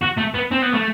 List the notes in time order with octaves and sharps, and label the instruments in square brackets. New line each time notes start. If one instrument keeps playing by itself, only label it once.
[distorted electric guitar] F#4
A3
B3
C4
B3
A3